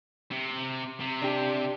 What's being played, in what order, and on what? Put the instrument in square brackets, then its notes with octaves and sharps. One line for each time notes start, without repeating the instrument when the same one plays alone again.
[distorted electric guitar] C3
C3
[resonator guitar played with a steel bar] D4 G4